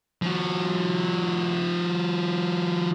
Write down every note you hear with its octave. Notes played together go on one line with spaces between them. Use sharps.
F3 F#4